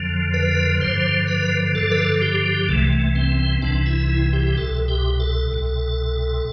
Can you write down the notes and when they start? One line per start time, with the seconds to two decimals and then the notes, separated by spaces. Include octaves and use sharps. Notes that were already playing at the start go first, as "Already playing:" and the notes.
Already playing: F2 D3 F3
0.34 B4
0.81 G2 D3 F3 C5
1.27 B4
1.75 G2 D3 F3 A4
1.91 B4
1.98 A4
2.22 G4
2.46 G4
2.68 C2 C3 E3 A3
2.93 A3
3.15 C4
3.39 C4
3.62 C2 C3 E3 D4
3.86 E4
4.09 E4
4.33 G4
4.47 G4
4.57 C2 B2 A4
4.88 G4
5.20 A4
5.51 C2 B2